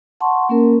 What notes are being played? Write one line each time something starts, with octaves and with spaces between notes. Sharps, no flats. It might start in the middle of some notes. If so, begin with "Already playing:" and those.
F#5 A5 C6 C#6
A#3 C#4 A#4